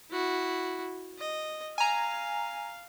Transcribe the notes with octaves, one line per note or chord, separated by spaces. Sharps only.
E4 F#4
D#5
F5 G#5 A#5